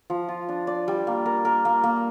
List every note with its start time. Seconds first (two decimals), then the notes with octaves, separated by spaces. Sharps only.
0.10 F3
0.29 F4
0.49 D4
0.67 D5
0.88 G3
1.07 A#3
1.26 A#4
1.45 A#4
1.65 A#3
1.84 A#3